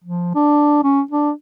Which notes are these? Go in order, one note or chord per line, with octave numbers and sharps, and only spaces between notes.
F3
D4
C#4
D4